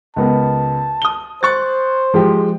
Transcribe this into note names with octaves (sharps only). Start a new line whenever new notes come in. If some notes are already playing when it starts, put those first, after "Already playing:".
C#2 B3 A#4 A5
D#6 G7
C5 C#6 F#6 A6
F3 G#3 G4